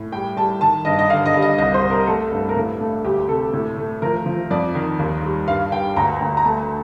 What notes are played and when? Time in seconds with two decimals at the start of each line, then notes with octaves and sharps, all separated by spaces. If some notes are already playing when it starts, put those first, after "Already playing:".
Already playing: A2
0.12 G3 G5
0.37 G3 A5
0.61 D#3 A5
0.85 G2 D#5
0.99 D#5
1.10 D3 F5
1.26 D#5
1.34 G3
1.42 D#5
1.58 C2 D#5
1.74 C5
1.83 C2
1.91 A#4
2.07 A3 A4
2.31 G2
2.49 A#4
2.56 A2 A4
2.80 A3
3.04 D2 G4
3.28 C3 A4
3.53 A2
3.77 A3
4.02 F3 A#4
4.26 F3
4.50 F2 D5
4.75 D#3
4.99 D#2
5.23 G3
5.47 G2 F5
5.72 G2 G5
5.96 D2 A#5
6.21 D2
6.37 A#5
6.45 A3 A5